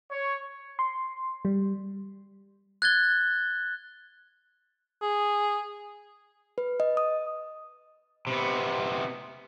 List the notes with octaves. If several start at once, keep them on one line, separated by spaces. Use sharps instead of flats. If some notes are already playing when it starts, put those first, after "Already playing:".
C#5
C6
G3
F#6 G#6 A6 G7
G#4
B4
D#5
D#6
C3 B3